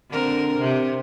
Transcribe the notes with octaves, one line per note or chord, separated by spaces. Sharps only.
D3 C4 A#4
C3